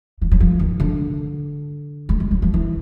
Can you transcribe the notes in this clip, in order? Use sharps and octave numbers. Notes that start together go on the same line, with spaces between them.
E3
F#3
F3
D#3
D3
G#3
G3
F#3
F3
E3